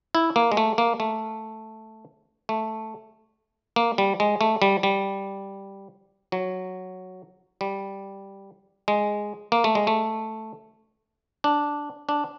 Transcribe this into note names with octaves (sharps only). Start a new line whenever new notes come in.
E4
A#3
G#3
A3
A#3
A3
A3
A#3
G3
G#3
A3
G3
G3
F#3
G3
G#3
A#3
A3
G#3
A3
D4
D4